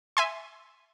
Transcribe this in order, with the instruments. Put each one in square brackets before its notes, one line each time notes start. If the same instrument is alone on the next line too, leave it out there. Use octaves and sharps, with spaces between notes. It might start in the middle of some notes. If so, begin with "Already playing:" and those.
[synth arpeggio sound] E5 G#5 C6